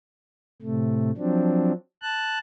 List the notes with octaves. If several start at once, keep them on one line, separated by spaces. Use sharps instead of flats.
A2 C3 A3
F3 F#3 C4 D4
A5 F#6